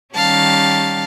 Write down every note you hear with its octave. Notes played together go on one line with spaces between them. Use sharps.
D#3 G3 C#4 F5 A5